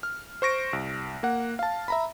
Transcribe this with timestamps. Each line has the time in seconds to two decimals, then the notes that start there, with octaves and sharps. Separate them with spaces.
0.03 F6
0.42 C5 C#6 A#6 D7
0.73 C2
1.23 A#3 F#5
1.59 F5 A5
1.88 E5 A#5 B5